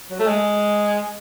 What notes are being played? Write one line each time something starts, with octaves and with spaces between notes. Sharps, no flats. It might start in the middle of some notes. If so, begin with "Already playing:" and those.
F#3
A3
G#3